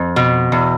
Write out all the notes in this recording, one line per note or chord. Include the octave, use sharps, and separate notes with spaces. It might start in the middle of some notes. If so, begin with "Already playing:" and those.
Already playing: F2
B2
E2